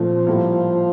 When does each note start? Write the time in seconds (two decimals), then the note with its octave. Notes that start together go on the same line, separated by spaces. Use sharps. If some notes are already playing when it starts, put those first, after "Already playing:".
Already playing: A#2 F3 A3 C4 F4
0.27 A2 G3 A#3 E4 A4